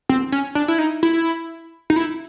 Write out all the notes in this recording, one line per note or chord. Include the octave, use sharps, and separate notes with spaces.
C4
C#4
D4
E4
D#4
E4
D#4
E4